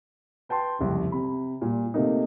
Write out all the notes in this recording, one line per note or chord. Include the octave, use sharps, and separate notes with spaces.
B4 G5 A5 C6
F#1 C2 F2
C3 B5
A#2 G3
C3 A3 A#3 D#4